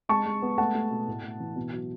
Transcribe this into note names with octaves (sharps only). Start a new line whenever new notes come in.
G#3 A5 C#6
G#3
B3
A3 F#5 A5
A3
B2
A2
A2
E3
B2
F#3